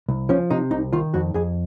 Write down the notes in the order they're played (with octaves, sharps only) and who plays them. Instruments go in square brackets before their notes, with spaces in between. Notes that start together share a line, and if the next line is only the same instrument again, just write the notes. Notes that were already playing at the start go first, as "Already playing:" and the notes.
[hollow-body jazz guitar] C2
F3 C#4
C3 D#4
C2 D#4
D#3 F4
F2 F#4
F2 G#4